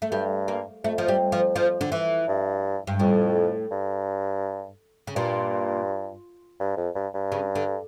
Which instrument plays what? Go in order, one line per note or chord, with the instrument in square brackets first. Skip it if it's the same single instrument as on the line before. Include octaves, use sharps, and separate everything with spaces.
[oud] A3
[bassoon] G2 [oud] G3
[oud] A#3
[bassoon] F2 [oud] A3
[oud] F3
G3
F3
F3
D3
E3
[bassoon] G2
[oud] G2
[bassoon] F2 [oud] A2
[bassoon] G2
[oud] C#3
[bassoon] G2 [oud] A#2
[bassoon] G2
F2
G2
G2
[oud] C#3
D3